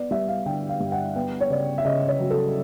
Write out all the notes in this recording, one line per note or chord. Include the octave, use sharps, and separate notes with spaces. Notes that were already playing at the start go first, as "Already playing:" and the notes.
Already playing: B3 D5
G3 E5
F5
D3 G5
F5
G2
F#5
B3 G5
C#5
C#3 D5
E5
C#3 D#5
C#5
F#3
A4